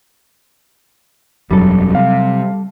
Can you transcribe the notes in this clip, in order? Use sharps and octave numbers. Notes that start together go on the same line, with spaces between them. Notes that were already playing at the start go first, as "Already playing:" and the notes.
E1 F#2 F#3 G3 A4
C3 F5